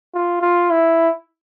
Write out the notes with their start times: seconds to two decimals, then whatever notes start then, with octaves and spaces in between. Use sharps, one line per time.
0.14 F4
0.42 F4
0.71 E4